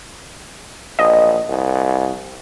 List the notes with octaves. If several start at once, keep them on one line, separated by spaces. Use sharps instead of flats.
A#1 D#5
C2